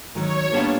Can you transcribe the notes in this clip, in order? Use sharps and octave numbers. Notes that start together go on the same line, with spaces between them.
G#2 D#3 F#3 C#5
A#2 G3 B3 D4 F4